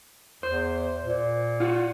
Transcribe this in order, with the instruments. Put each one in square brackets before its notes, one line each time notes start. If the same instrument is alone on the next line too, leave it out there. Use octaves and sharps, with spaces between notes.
[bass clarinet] E2 [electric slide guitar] C5
[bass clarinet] A#2
[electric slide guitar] F4 F#4